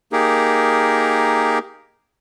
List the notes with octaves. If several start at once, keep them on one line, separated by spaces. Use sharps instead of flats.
A#3 D#4 G4 G#4 A#4